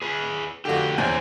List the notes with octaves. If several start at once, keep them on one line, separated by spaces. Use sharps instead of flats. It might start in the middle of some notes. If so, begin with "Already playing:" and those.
G#4 B4
F2 D3 F#4 G4
E2 B3 C#4 C5